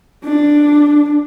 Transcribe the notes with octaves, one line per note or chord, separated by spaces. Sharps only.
D4